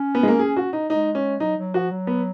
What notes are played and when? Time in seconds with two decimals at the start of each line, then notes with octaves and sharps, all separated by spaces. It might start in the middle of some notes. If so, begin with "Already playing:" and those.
Already playing: C#4
0.15 B3
0.23 G#3
0.28 A#3
0.39 G#4
0.57 F#4
0.73 D#4
0.90 G#3 D#4
1.15 C#4
1.40 F#3 D#4
1.58 F#3
1.74 F3 F#4
1.91 F#3
2.07 B3